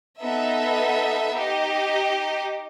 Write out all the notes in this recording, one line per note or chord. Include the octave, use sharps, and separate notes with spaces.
B3 D#4 A4 E5
D#4 G4 D#5